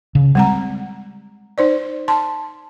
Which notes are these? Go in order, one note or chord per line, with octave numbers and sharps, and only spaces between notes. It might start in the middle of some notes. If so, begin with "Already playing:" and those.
C#3
G3 G#3 C4 F#5 A#5
D#4 C5 D5
A5 C6